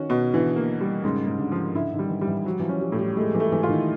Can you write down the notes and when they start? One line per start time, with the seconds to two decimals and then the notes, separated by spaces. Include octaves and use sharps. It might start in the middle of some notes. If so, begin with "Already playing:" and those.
Already playing: D#3 C#4 F#4
0.10 B2
0.33 D3 E3
0.56 A#3
0.81 G3
1.04 G#2 C#3
1.27 G#2
1.39 D3
1.52 F3
1.75 D3 E4
1.93 D#3
1.99 G3
2.09 E3
2.21 G3
2.28 E3
2.45 F3 F#3
2.60 E3
2.63 F3
2.69 C#4
2.81 G3
2.92 A2
2.99 G3
3.17 G#3 A3
3.35 E3
3.40 A3
3.52 E3
3.63 F4
3.69 D#3